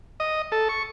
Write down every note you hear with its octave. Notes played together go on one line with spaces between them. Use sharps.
D#5
A4
C#6